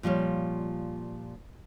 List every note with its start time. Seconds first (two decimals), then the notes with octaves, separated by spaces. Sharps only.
0.03 A#2 F3 G3 C#5